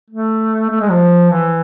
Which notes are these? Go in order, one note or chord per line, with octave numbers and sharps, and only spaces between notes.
A3
A3
G#3
F3
E3